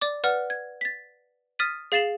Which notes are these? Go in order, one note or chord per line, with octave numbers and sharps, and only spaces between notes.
D5 D6
B4 D5 F#5 F6
G#6
A6 B6
D#6 F6 A6 B6 D#7
G#4 F5 A6 C7 E7 F#7